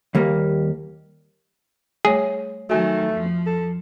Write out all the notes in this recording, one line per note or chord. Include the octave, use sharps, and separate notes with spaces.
D#2 G3 A#3
G3 A3 G#4 C#5
D#3 F#3 A3 F#4 G#5
F2 F3
A4